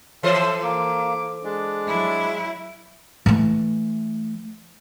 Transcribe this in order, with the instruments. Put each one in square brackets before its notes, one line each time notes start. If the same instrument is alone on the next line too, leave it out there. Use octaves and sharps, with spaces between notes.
[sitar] E3 A4 C5 [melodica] E5
[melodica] A#3 [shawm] D6
[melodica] G#3 [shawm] D4
[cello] F#3 E4
[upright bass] E3 A3